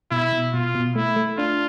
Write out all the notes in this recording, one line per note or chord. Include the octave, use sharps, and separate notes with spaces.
B2 E4
B2
B2 F4
B2
A3 E4
A3
D4 F4